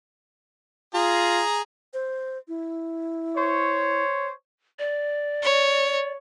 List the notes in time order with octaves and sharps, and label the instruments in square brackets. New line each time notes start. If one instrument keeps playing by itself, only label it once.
[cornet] F4 [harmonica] G#4 A#5
[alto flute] C5
E4
[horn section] C5 C#5
[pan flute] D5
[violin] C#5